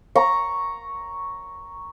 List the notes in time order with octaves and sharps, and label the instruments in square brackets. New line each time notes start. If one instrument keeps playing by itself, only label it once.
[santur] A#5 C#6